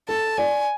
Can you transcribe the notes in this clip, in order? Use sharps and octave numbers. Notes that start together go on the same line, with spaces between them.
A4 A5
D5 G#5